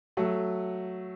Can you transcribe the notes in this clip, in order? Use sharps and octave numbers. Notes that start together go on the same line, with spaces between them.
F#3 A3